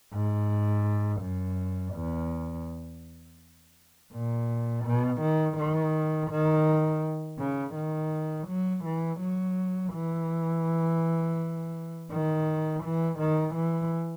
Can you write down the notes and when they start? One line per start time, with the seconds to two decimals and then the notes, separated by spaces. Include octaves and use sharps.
0.13 G#2
1.22 F#2
1.94 E2
4.13 A#2
4.86 B2
5.22 D#3
5.58 D#3
6.31 D#3
7.39 C#3
7.75 D#3
8.48 F#3
8.85 E3
9.21 F#3
9.94 E3
12.11 D#3
12.84 E3
13.20 D#3
13.56 E3